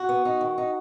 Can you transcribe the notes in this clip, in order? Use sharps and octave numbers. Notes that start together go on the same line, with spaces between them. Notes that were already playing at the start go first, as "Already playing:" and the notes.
Already playing: F#4
B3
D#4
D#3
D#4